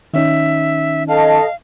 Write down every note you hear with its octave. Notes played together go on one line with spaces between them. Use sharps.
D#3 C#4 D#4 E5
A4 D#5 F5 A5